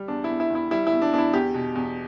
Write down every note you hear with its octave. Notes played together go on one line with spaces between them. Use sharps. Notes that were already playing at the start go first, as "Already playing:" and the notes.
Already playing: G3
E2 D4
E4
E2
E4
E2
E4
G3 E4
E4
E2
D4
E2 D4
E4
E2 G4
B2
E2